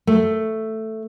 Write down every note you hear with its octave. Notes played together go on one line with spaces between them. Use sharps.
A3